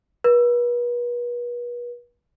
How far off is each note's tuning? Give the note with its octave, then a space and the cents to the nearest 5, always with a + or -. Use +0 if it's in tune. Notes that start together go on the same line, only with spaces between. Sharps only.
B4 -40